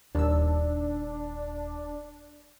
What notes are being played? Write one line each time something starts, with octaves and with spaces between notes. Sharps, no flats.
D#1 D#2 D4 D#4 E6